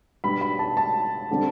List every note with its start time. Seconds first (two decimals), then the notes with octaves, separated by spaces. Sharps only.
0.24 B2 G3 B3 D4 B5
0.41 B5
0.59 A5
0.77 A5
1.31 D3 G3 C4